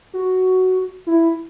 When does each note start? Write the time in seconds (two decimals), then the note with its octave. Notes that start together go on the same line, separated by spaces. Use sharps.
0.13 F#4
1.07 E4